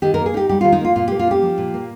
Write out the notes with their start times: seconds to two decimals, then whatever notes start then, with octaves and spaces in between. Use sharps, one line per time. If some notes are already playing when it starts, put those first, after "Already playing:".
0.02 D#3 G4
0.14 A#3 A#4
0.26 G#4
0.34 D#4 G4
0.49 G3 G4
0.61 D#3 F4
0.72 D#4
0.81 A#3 F4
0.96 A#2 F4
1.08 A#3 G4
1.19 F4
1.27 C#4 G4
1.42 F3
1.58 A#2
1.74 A#3